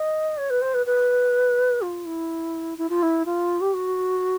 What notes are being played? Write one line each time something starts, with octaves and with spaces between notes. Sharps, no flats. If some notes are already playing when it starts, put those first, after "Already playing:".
Already playing: D#5
C#5
B4
C5
B4
B4
F4
E4
E4
F4
E4
F4
G4
F#4